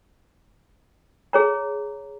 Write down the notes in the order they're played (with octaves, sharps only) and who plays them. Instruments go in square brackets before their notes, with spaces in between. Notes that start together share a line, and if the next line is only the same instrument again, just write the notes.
[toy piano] G#4 C#5 A#5